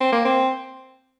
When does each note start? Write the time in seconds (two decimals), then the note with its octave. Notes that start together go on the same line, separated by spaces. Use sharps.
0.01 C4
0.12 A#3
0.25 C4